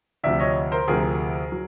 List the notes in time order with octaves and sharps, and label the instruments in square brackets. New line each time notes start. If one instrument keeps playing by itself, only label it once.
[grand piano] D2 C3 F3 D5 E5
C#5 D#5
A#4 C5
D2 C3 F3 G#4 A#4
F#3